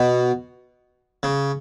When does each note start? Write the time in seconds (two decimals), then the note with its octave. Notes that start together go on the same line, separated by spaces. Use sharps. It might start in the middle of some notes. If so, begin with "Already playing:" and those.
Already playing: B2
1.23 C#3